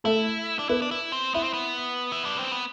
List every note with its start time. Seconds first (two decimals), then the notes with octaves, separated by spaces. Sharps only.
0.04 A3 E4 A4
0.59 D4
0.69 B3 E4 B4
0.82 D4
0.91 E4
1.12 C4
1.34 B3 E4 E5
1.43 C4
1.53 B3
2.12 E4
2.25 D4
2.39 C4
2.52 B3